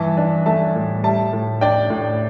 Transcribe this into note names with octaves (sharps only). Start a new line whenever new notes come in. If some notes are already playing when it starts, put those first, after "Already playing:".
Already playing: G2 E3 E5 A5
D4
A3 E5 A5
A2
G3 E5 A5
A2
D4 D5 G5
A2